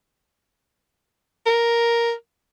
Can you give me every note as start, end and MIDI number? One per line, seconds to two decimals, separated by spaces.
1.46 2.13 70